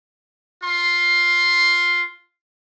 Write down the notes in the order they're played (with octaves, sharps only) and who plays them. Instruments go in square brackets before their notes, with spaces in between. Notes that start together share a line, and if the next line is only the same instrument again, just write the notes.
[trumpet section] F4 C6